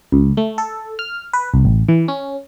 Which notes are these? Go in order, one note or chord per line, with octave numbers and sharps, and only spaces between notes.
C#2
A3
A4
F6
B4
C2
A1
E3
C#4